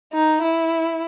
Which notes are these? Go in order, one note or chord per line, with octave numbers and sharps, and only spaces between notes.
D#4
E4